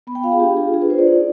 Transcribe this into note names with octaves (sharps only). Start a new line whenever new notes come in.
B3 B5
G5
F4 F5
G#4
D4 G4
F4 G#4
D4 G#4
B4
F4 C5
D5
D#4